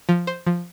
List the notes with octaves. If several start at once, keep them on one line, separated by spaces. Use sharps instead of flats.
F3
C5
F3